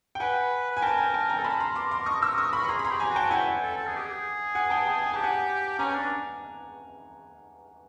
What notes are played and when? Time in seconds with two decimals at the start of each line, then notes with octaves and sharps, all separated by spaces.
0.15 G5
0.20 B4 F#5 G#5
0.71 B4
0.77 G#5
0.82 A#4 G5 A5
0.98 G#5 A#5
1.14 G5 A5
1.30 G#5 A#5
1.39 A4
1.44 A#4 A5 B5
1.60 A#5 C6
1.75 C6 D6
1.91 C6 D6
2.06 C#6 D#6
2.22 D6 E6
2.38 C#6 D#6
2.53 B5 C#6
2.64 C#6
2.68 G#4 A#5 C6
2.79 B5
2.84 A#5 C6
2.90 G4
3.00 G#5 A#5
3.10 F#4
3.16 G5 A5
3.31 E4 F#5 G#5
3.62 A4
3.77 A4
3.87 G#4
3.97 G4
4.06 G#4
4.55 F#5 G#5
4.70 G5 A5
4.86 G5 A5
5.02 G#5
5.13 G4 A5
5.24 F#5 G#5
5.79 C#4 G#5 A#5
5.95 D4